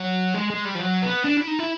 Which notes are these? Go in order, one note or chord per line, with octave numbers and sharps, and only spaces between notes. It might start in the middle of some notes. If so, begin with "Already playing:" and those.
Already playing: F#3
G#3
G#3
G3
F3
F#3
B3
D4
E4
D#4
E4